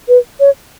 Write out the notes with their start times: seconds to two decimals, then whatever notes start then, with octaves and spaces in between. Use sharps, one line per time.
0.08 B4
0.40 C#5